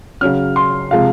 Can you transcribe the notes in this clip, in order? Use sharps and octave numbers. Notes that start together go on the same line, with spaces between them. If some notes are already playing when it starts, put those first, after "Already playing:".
C#3 F#3 C#4 F6
C6
C3 F3 G#3 F5